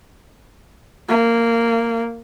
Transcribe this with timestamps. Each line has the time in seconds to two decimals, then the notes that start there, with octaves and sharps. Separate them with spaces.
1.09 A#3